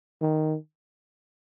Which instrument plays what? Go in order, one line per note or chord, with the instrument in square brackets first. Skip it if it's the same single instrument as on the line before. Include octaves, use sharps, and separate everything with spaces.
[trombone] D#3